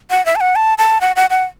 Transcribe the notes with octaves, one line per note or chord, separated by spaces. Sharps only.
F#5
E5
A5
F#5
A5
A5
F#5
F#5
F#5